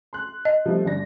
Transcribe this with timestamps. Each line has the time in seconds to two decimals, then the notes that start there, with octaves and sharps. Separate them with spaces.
0.13 C6 F#6
0.45 D#5
0.66 F3 G3 A3
0.85 G1 D5 A#6